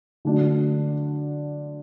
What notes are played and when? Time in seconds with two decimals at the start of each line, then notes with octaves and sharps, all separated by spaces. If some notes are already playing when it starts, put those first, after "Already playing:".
0.25 D3 F#3 A3 D4